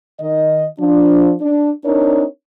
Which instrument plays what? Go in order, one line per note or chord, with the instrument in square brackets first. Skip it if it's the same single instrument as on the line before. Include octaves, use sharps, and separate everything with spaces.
[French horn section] D#3 D#5
F3 D4
D4
C4 D4 D#4 A#4 C#5